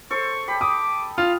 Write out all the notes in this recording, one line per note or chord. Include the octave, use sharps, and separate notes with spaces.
A4 C5 C#6
G4 A5 B5
D6 D#6
F4 F6